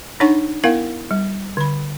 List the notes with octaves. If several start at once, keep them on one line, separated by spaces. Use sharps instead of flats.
D4 D#4 C#5 F#5 A5 C#6
B3 E4 A#4 F5 F#5
G3
D3 B5